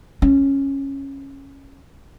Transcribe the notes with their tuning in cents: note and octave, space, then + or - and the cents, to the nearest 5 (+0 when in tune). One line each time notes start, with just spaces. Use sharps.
C#4 -10